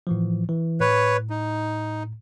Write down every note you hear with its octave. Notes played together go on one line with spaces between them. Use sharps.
A2 E3 F3
E3
A2 B4 C#5
D#4